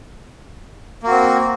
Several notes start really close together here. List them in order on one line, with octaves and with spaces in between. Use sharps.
A#3 F#4 C4